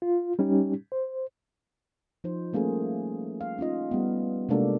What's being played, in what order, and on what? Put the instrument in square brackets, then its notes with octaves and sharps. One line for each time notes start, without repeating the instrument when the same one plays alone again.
[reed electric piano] F4
G3 C#4 D#4 G4
C5
[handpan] F3 D#4 C5
G3 A3 A#3 C#4 G#4
F5
C#4 D#4 F4 D#5
G3 A3 B3
C3 G#3 A#3 D4 F#4 A4